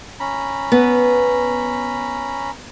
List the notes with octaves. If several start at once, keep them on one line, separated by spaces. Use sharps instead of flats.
C#4 A#5 B5
B3